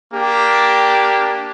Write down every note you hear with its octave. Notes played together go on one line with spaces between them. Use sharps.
A#3 D4 G4